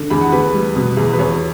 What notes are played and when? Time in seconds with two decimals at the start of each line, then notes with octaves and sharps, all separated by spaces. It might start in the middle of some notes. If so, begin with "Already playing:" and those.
Already playing: D3
0.10 E2 B5
0.21 F#5
0.32 E2 B4
0.54 G3
0.76 B2
0.97 E2
1.13 B4
1.19 E2 C#5